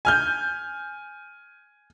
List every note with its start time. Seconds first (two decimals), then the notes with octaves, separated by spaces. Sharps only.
0.05 G#5 F6 G6